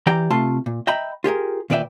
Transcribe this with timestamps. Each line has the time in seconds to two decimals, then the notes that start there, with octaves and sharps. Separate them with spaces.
0.07 E3 G4 D5 G5 A#5
0.30 C3 A3 F4 A5 C6
0.66 A#2
0.87 D#5 E5 G5 A#5 B5
1.24 F4 G4 G#4 A#4
1.70 D#2 A#2 B4 D5 E5 G5